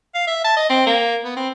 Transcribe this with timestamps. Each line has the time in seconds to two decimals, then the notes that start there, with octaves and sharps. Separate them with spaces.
0.14 F5
0.27 E5
0.44 A5
0.56 D#5
0.70 C4
0.86 A#3
1.24 B3
1.36 C4